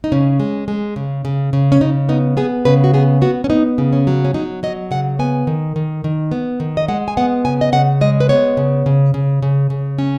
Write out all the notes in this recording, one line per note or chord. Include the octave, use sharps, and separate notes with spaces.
D#4
C#3 C#4
G#3
G#3
C#3
C#3
C#3
C#4
C#3 D#4
B3 D#4
B3 G#4
C#3 B4
F#4
B3 G#4
B3 F#4
C#4
B3 D#4
C#3
C#4
F#3
C#4
F#3 D#4
F#3 D#5
C#3 F#5
B3 G#5
D#3
D#3
D#3
B3
D#3
D#5
G#3 F#5
G#5
B3 F#5
C#3 G#5
D#5
C#3 F#5
G#3 D#5
B4
B3 C#5
C#3
C#3
C#3
C#3
C#3
C#4